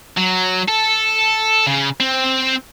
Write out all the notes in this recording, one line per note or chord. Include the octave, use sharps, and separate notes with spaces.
F#3
A4
C#3
C4